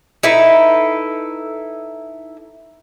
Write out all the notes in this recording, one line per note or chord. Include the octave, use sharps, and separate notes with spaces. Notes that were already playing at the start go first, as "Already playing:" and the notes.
D#4 E4 A4 B4